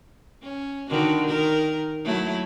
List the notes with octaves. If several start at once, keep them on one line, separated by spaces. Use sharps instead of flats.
C#4
D3 D#3 F#4
D#3 A#4
F#3 A3 E4